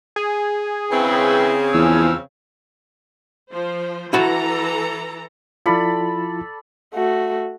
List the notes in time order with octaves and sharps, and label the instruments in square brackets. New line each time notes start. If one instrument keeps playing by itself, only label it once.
[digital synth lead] G#4
[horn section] C#3 C4 [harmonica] E4 B4 G5
[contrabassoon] E2 [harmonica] F3 E6 F6
[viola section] F3 C5
[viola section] E3 A4 A#5 [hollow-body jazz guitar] E4 F#4 A5
[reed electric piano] F3 E4 F4 [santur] A4 D5 B5
[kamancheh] A3 F#4